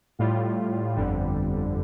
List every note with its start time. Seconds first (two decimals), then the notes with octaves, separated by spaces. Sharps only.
0.19 A2 G3 F4
0.95 G1 F2 D3 G3